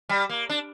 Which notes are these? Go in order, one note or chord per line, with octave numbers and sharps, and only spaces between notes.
G3
A#3
D4